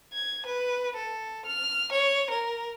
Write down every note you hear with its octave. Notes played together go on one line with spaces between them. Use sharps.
G#6
B4
A4
F6
C#5
A#4